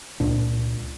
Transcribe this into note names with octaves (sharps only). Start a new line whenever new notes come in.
C#2 A#2 D4